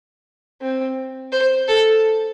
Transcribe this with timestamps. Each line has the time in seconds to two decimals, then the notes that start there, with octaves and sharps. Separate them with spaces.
0.61 C4
1.32 C5
1.68 A4